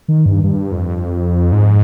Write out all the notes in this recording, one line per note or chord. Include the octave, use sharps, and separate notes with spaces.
D#3
G2
G2
F2
G#2